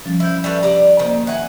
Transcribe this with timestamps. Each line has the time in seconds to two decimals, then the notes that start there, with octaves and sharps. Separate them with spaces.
0.06 F3 G3 C#4
0.20 E4 C5 G6
0.44 G3 A3 B4
0.63 G4 D5 A#5
0.99 D#3 A#3 C5
1.27 E5 F#5 G#5